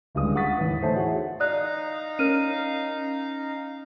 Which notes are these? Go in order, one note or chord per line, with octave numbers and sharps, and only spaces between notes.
D1 C#2 D3 G3 G#3 D#6
F#5 C#6 D#6 A6 B6
E2 A2 D#3 E3
A3 D#4 C5 C#5 A5
E4 F#4 G#4 F#5
D#4 D5 F5 A#5 D#6 F#6
C#4 A#4 F6 D#7